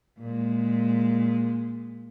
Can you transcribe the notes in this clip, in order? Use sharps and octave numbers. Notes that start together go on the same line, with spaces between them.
A#2 G#3